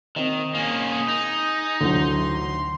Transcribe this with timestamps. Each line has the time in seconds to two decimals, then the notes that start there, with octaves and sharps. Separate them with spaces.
0.16 D#3 C4 D#5
0.55 A#3 C#4 G#4
1.08 D#4
1.81 A1 D2 D3 F#3 C6